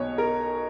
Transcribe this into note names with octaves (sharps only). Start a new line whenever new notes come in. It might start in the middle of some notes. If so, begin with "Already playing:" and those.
Already playing: B1 B2 C#5
A#4